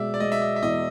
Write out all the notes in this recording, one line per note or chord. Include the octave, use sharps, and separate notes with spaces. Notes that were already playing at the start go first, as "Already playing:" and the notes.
Already playing: B2 G#3 D5 E5
D5
G#3 D#5
E5
D#5
E5
E2 D#5